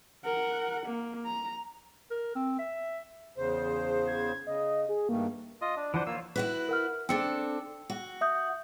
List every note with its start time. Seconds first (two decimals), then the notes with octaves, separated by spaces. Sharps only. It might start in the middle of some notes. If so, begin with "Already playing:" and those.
0.25 A#4 F#5
0.86 A#3
1.25 A#5
2.10 A#4
2.35 C4
2.58 E5
3.37 E2 C#3 C5
4.07 G#6
4.47 C#3 D#5
4.89 G#4
5.09 G2 D#3 A3 A#3
5.61 F4 D#5
5.77 D4
5.94 E3 F3 D4 C5 F#5
6.07 F3 A#3 F4 C#5 E6
6.36 E4 F#4 B4
6.69 A#4 F#5 F6
7.09 C4 D4 A4 G5 E6 C#7
7.90 F#4
8.21 E5 D#6 G6